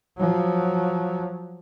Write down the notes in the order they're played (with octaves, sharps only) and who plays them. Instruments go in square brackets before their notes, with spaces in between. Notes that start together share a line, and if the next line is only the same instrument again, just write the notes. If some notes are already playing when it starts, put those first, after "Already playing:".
[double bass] F3 F#3